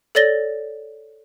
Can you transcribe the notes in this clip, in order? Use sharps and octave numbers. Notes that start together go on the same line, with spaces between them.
A4 C#5 D5 A6 A#6 G7